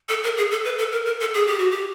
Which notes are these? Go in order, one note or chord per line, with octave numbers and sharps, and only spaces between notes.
A4
A#4
G#4
A4
B4
A4
A#4
A#4
A4
G#4
G4
F#4
G4